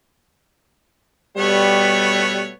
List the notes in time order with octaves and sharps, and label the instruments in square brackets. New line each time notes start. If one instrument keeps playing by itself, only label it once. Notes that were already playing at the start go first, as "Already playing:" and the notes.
[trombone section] B2 G3 [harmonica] A3 B3 C#5